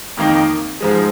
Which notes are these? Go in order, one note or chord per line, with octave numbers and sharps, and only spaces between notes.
F2 D#3 A#3 D#4
G#2 F3 G#3